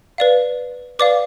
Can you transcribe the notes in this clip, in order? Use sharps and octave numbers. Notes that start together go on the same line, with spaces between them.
B4 D5 F5
B4 D5 F5 D6